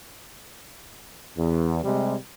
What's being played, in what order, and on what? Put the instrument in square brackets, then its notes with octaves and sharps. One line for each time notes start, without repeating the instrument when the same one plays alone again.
[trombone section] E2
C3 G3 G#3